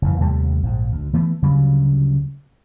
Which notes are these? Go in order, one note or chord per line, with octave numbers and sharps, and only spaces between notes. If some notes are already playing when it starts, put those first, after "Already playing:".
F#1 F2 E3
D#2 C3 G3 A3
A#1 G#2
D2
E3 A3 B3
D2 C#3 F#3 G3